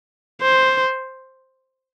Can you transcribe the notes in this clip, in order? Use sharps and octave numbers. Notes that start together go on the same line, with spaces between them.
C5